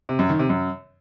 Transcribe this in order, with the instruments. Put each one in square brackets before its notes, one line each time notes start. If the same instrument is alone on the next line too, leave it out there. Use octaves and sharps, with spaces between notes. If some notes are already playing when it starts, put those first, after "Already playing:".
[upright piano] C3
F#2
D#3
C3
F#2